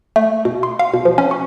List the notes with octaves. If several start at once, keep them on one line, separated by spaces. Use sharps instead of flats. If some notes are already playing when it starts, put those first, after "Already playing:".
A3
B2
C6
F5
B2
F3
C#4
C#6